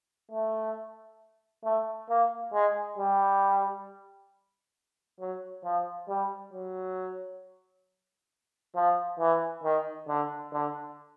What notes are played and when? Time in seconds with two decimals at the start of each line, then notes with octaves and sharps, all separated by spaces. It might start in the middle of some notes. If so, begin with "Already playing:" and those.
0.31 A3
1.64 A3
2.09 A#3
2.53 G#3
2.98 G3
5.20 F#3
5.64 F3
6.09 G3
6.53 F#3
8.75 F3
9.19 E3
9.64 D#3
10.08 D3
10.53 D3